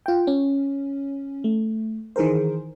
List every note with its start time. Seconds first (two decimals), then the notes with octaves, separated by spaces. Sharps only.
0.06 F4 G5
0.27 C#4
1.44 A3
2.16 D#3 E3 G#4 A#4 C5